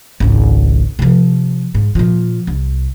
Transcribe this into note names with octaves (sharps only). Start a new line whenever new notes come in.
G#1 C#2
C3 F3
G#2
A#2 F3
C2